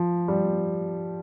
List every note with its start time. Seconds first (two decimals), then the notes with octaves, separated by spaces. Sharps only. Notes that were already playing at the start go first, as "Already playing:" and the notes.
Already playing: F3
0.28 G3